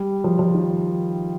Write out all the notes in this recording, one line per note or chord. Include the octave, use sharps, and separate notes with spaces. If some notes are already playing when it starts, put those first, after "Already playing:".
Already playing: G3
F3
F3
D#3